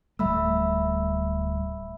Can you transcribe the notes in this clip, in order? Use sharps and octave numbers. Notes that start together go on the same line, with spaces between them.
D1 G3 A3 E5 B5 E6